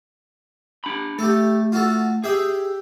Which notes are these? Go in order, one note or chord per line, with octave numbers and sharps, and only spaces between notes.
D4 A#5 B5
A3 G4 A4
F4 F#4 A4
G4 G#4 E5 G5